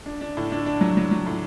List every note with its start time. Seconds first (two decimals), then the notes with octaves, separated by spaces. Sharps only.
0.06 D4
0.21 D4
0.37 A2
0.52 D4
0.66 D4
0.81 F#3
0.97 F#3
1.11 F#3
1.26 A2